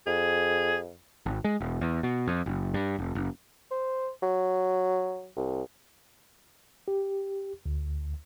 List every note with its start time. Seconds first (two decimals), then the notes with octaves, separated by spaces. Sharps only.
0.07 F2 G#4
1.26 G#1
1.44 G#3
1.61 E1
1.81 E2
2.03 B2
2.27 F2
2.46 F#1
2.74 G2
2.99 F1
3.15 F#1
3.71 C5
4.23 F#3
5.36 C2
6.88 G4
7.66 D2